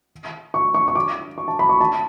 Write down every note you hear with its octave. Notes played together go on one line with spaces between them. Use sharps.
C#6
C#6
C#6
D6
C#6
A5
B5
C#6
A5